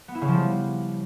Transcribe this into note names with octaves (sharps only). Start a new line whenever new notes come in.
B3
E4
C#3
F3
G3